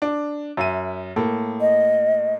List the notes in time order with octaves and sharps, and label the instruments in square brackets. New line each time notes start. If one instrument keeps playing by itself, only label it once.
[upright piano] D4
F#2 E5 D#7
A2 A#3 A4
[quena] D#5